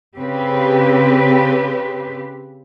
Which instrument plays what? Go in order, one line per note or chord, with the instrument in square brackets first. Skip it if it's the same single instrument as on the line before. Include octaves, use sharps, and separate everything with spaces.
[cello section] C#3 C4 G4 B4